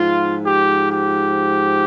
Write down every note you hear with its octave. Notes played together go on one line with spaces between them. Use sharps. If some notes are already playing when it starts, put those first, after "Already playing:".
Already playing: G#2 F3 F4
G4
G4